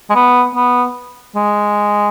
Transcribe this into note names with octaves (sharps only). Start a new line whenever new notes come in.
G#3
B3
B3
G#3